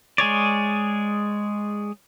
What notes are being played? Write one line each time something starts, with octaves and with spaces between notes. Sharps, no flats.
G#3 G#4 C#5 D5